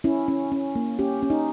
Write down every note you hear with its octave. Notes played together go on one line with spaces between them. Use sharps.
C#4 E4
C#4
C#4
A#3
C#4 G4
C#4
D#4